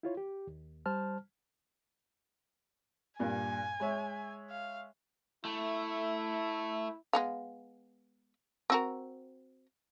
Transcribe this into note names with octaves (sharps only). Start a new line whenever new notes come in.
E4 F4 C#5
G4
D#2
G3 C5 A5 F6
G2 A#2 G#5
G#3 C#5 E5
F5
A3 E4
G#3 B3 F5
C4 F#4 A#4